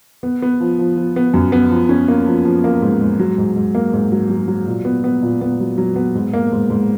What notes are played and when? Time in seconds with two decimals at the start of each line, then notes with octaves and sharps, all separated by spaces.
0.23 B3
0.42 B3
0.60 F3
0.79 F3
0.97 F3
1.16 B3
1.34 F#2
1.52 B3
1.71 F3
1.89 C#4
2.08 A#3
2.26 F3
2.45 F3
2.64 A#3
2.82 G#2
3.01 G#2
3.20 F#3
3.38 G#2
3.56 G#2
3.75 A#3
3.93 G#2
4.12 F#3
4.30 F#3
4.48 F#3
4.67 A#2
4.85 B3
5.04 B3
5.23 A#2
5.41 B3
5.60 F#3
5.78 F#3
5.96 B3
6.15 G#2
6.33 A#3
6.52 G#2
6.70 G#2